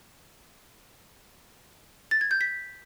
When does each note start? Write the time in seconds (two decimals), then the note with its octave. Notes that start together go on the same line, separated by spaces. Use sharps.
2.11 A6
2.21 G#6
2.31 G6
2.41 B6